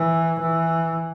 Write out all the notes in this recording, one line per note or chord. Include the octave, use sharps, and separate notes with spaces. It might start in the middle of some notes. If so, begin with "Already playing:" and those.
Already playing: E3
E3